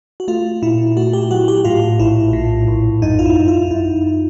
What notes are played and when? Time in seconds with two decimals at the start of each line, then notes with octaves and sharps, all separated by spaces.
0.20 F#4
0.28 A3 F4
0.62 A#2 E4
0.97 A3 F#4
1.13 G4
1.31 F#3 F#4
1.48 G4
1.65 A2 F4
2.00 A#1 E4
2.33 A2
2.68 A#1
3.02 F#2 D#4
3.19 F4
3.26 E4
3.36 F#2
3.48 F4
3.71 F#2 E4